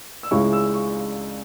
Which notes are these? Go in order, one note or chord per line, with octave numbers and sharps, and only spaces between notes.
E6
C#2 C#3 G#3 C#4 E4 C#6
E6
C#6